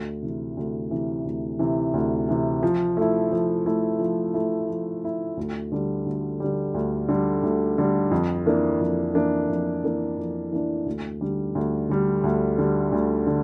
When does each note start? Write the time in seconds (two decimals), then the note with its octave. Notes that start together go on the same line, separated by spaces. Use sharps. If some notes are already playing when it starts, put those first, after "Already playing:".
Already playing: D2
0.22 C3 E3
0.57 D2
0.91 C3 E3
1.25 D2
1.59 C3 E3
1.94 D2
2.29 C3 E3
2.63 F3
2.97 A3 E4
3.31 F3
3.66 A3 E4
4.00 F3
4.34 A3 E4
4.69 F3
5.03 A3 E4
5.37 D2
5.72 D3 G3
6.06 D2
6.40 D3 G3
6.74 D2
7.08 D3 G3
7.43 D2
7.78 D3 G3
8.11 F2
8.46 E3 A#3 D4
8.81 F2
9.14 E3 A#3 D4
9.49 F2
9.84 E3 A#3 D4
10.18 F2
10.52 E3 A#3 D4
10.86 D2
11.21 D3 G3
11.55 D2
11.89 D3 G3
12.24 D2
12.58 D3 G3
12.92 D2
13.27 D3